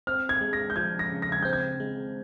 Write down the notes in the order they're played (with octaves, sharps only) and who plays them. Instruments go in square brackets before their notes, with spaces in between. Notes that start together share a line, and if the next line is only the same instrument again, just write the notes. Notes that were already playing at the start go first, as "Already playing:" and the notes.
[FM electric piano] C4 [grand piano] F6
[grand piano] G#6
[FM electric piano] G#3
[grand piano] A#6
G6
[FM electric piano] F3 [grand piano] G#6
[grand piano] A#6
[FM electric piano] C#3
[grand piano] A#6
G#6
[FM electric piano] C4 [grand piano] G6
[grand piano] G#6
[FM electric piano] G#3